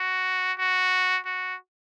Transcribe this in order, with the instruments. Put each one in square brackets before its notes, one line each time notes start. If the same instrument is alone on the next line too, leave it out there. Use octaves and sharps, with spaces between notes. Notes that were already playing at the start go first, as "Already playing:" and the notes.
Already playing: [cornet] F#4
F#4
F#4